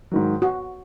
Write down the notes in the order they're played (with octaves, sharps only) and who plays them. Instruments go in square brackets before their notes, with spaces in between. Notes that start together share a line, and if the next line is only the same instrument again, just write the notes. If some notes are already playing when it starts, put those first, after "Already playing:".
[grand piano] G#2 D#3 F#3
[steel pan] F#4